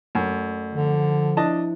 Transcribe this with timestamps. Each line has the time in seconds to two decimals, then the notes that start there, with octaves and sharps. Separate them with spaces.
0.15 F#2 A3
0.73 D3 F3
1.37 D4 E4 D#5 A5